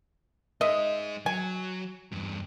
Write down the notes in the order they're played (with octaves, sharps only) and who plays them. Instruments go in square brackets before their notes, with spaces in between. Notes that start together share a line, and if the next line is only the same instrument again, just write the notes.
[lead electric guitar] G#3 D#4 [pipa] D#5 E5
[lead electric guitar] F#3 [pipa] G#5
[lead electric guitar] E2 G2